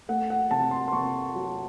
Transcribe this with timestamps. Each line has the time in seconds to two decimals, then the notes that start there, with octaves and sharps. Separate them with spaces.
0.09 A3 F#5
0.30 F#5
0.51 C3 A5
0.71 C6
0.88 C6
0.92 C3 C#6
1.35 F#3